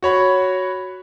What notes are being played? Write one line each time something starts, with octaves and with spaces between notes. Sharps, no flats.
F#4 C#5 B5